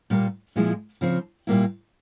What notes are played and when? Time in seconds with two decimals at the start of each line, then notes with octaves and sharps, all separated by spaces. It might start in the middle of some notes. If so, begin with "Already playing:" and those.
0.10 A#2 G3 A#3
0.56 A#2 F3 G#3 E4
1.01 C#3 F3 C4
1.47 A#2 G3 A#3 E4